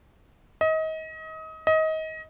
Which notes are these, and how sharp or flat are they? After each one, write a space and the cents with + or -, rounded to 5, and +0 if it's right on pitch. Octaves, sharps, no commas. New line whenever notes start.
D#5 +30
D#5 +25